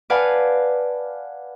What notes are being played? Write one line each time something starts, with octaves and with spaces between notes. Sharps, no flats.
B4 D5 F5 F#5 G#5 A5